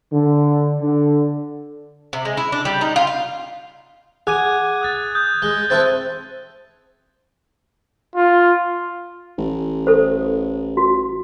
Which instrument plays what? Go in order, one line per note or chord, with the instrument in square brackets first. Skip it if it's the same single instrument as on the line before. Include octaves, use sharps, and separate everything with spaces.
[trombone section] D3
D3
[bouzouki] C3
G#3
E4
D4
G3
D#4
F4
F5
[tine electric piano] G#4 F#5 D6 [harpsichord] G#5 [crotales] F#6 G#6 D#7
[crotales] D#6 F#6 A6
[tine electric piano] D#6 [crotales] G6
[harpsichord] G#3 [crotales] G7
[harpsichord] C4 E4 A4 [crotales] F#6 A6
[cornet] F4
[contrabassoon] A1
[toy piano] A4 C5
F#4